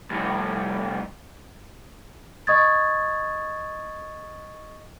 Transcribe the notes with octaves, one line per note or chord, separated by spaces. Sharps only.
C2 A2
D#5 C#6 D#6 G#6 A6